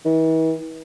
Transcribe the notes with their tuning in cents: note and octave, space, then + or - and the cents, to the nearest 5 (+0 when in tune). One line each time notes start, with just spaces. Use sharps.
E3 -45